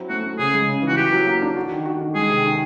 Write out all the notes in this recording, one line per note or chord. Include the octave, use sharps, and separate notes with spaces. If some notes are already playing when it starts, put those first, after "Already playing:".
Already playing: F#3 C4 E4
A3 F#4
A3
C#3 G#4
G#3
C#3
E3
F#4
F#3 G4
F#3
A#3
D4
F#4
D#3
F#4
D#3
G#3 G#4
C3
D#3